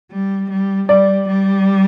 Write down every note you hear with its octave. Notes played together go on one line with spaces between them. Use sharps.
G3
G3
G3 D5
G3